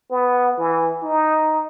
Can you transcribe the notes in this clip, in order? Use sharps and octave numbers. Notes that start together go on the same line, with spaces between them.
B3
E3
D#4